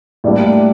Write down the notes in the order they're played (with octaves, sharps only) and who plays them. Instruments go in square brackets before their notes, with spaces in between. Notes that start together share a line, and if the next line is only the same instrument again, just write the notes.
[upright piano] A2 G3 A#3 D4 G4